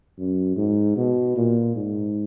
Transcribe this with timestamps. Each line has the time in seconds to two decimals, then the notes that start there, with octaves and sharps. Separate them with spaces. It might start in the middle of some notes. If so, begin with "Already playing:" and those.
0.19 F#2
0.57 G#2
0.97 B2
1.36 A#2
1.75 G#2